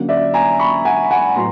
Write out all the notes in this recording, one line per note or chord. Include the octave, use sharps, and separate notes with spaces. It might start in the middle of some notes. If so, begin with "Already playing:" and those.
Already playing: D3 F#3 A#3 C#4
D5 E5
G#5 A#5
B5 C#6
F#5 G#5
F#5 G#5
A2 F#3 B3 A#5 C6